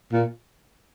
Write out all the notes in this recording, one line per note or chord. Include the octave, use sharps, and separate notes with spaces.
A#2